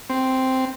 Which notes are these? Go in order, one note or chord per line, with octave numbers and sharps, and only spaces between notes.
C4